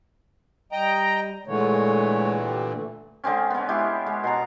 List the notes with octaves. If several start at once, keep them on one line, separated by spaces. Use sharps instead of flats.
G3 D#5 G5 A#5
A#2 D3 E3 G#3 A3 C#5
G4
A3
D3 G#3 C4 C#4
B3 C#4
G#3 E4 G4
G#3
B2 A5 A#5